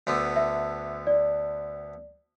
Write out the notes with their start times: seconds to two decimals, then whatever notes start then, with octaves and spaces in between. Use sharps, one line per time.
0.07 D2 D3 B3
0.36 E5
1.07 D5